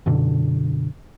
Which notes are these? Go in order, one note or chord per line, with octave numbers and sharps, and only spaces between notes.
F#2 B2 D3